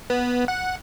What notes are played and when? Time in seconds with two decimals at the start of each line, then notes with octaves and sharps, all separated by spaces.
0.10 B3
0.48 F#5